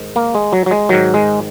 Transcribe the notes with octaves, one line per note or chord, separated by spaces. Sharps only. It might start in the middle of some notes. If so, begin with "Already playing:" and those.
Already playing: G#2 D#3
A#3
G#3
F#3
F#3
G#3
G#2 D#3 F#3
G#3